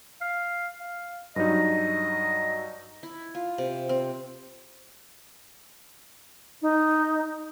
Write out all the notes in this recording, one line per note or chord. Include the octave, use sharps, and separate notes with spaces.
F5
F5
G2 F#3 D#4 D#5
E4
F4
C3
C4
D#4